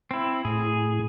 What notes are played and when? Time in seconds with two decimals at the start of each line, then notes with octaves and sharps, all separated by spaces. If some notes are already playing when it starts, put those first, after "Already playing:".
0.11 C4 E4
0.45 A2 G#4